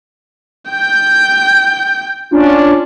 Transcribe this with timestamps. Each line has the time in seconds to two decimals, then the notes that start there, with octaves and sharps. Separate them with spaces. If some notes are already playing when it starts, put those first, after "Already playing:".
0.71 G5 G6
2.31 C#4 D4 F4